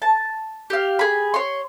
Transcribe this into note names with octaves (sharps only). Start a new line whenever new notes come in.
A5
G4 F5
G#4 B5
C#5 C6